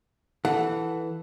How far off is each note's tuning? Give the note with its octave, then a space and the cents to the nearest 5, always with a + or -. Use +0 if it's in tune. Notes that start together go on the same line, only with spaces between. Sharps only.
E3 +0 A4 +0 F#5 +0